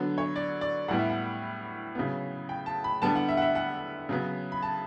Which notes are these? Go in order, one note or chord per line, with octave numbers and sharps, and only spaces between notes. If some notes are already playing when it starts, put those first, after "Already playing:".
Already playing: D3 F#3 B3
C#5
D5
D5
A2 G3 B3 F#5
E5
F#5
C#3 F#3 B3
G5
A5
B5
D3 G3 B3 A5
F#5
E5
F#5
E5
F#5
C#3 F#3 B3
B5
A5